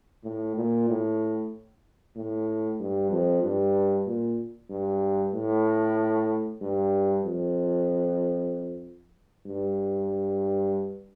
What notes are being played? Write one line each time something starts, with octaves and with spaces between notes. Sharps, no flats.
A2
A#2
A2
A2
G2
F2
G2
A#2
G2
A2
G2
F2
G2